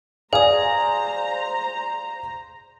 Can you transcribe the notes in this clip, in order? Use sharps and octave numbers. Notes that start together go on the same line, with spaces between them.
G#4 C5 D5 F5 G#5 A#5 D#6